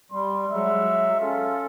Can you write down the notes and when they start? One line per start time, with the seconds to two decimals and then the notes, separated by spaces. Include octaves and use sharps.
0.12 G3 C6
0.51 F#3 G#3 E5
1.21 C#4 F4 A4